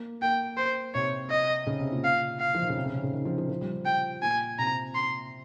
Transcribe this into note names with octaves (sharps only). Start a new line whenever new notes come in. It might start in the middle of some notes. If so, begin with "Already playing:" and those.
Already playing: A#3
A#3 G5
C5
C3 C#5
D#5
C#3
C3
A#2
F5
F5
F3
D#3
C#3
C3
C#3
C3
C#3
D#3
F3
F3
F3
G3
G5
A#2 G#5
C3 A#5
C6